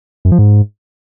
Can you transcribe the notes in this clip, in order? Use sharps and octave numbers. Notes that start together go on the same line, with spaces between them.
F#2
F3
G#2